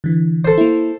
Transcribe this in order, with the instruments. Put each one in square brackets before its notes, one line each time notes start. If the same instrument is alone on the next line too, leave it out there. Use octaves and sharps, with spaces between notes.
[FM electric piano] D3 E3
[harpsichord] A4 C5
[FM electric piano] A#3 E4